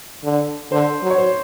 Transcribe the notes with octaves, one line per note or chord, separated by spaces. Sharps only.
D3
D3 C5
F#3
C#5
C5